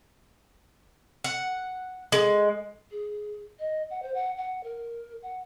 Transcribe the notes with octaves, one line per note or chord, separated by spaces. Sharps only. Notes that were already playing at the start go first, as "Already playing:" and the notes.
F#5
G#3
G#4
D#5
F#5
C5
F#5
F#5
A#4
F#5